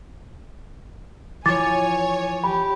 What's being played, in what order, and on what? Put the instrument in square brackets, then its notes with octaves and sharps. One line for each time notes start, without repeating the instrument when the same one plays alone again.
[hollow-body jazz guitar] E3 F3 [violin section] C#5 [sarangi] G#5 [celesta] D6 A6
[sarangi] G4 [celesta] B5